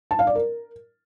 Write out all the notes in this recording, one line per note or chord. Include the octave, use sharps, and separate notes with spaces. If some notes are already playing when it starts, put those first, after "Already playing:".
A5
F5
D5
A#4